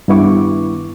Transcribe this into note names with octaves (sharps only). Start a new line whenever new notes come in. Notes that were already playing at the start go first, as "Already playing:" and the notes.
G2 D#3 B3 E4 C#6 D6